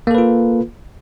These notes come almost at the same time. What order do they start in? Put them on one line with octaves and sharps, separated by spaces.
A#3 A4 B4 F4